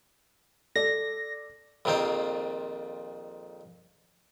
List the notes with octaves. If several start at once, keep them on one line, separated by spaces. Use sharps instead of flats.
A4 D5 A#6
A#1 F2 D#3 C4 C5